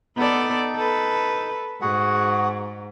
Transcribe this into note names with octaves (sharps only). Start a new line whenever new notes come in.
B3 D#4 A4 D5
A4 B4
G#2 F#4 G#4 F#5